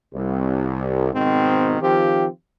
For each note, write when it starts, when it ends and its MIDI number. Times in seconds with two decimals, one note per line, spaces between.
0.14 1.13 36
1.14 1.76 44
1.14 1.76 47
1.14 1.76 51
1.14 1.76 60
1.81 2.28 51
1.81 2.28 53
1.81 2.28 60
1.81 2.28 65
1.81 2.28 67